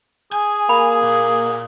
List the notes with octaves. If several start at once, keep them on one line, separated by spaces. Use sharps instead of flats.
G#4 G#5
A#3 B5
A#2